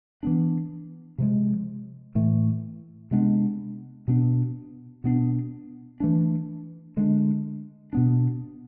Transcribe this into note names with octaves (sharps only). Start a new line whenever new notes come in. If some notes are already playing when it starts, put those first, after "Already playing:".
E3 B3 D4
C3 F3 G#3
A2 E3 A3
C3 G#3 B3 D4
B2 B3 D4
B2 B3 D4
E3 A3 D4
D3 G#3 B3 D4
B2 B3 D4